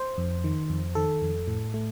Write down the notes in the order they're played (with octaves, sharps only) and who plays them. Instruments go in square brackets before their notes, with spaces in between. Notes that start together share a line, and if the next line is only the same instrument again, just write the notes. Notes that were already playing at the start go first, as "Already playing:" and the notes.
Already playing: [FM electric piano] C5
F2
D#3
F2
D#3 A4
F2
A2
A3